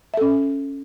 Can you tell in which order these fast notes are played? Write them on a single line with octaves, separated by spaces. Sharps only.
E5 A4 C#4